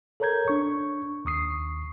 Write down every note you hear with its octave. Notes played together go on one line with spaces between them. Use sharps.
A4 A#4 C#5 A#5 G6 G#6
D4 C#6
D#2 C#6 D#6 C7